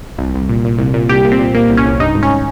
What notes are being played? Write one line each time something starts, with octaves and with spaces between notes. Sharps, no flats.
C2
C2
A#2
A#2
C2
A#2
C2 G4
A#2
C4
A#2
A#2 A#3
C2
C#4
C2
G2 D#4
G#1
C#4